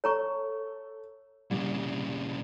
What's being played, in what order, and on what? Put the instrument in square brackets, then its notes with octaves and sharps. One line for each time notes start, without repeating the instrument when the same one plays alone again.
[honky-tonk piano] A4 [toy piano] C#5 A#5 C#6
[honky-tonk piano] C2 [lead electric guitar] A#2 C#3